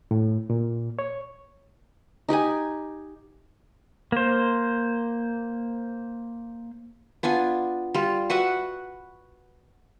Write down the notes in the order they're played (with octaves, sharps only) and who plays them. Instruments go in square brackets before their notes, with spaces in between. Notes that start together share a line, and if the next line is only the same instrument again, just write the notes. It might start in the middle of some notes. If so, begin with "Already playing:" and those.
[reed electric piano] A2
A#2
C#5
[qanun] D#4 G4 F#5 G#5
[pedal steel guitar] A#3 C5
[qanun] B3 D4 F4 G#5
G3 F4
F#4 B4 E5 F#5